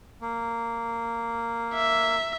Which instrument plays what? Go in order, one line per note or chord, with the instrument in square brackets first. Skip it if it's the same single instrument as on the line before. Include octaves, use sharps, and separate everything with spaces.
[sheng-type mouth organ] A#3
[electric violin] E5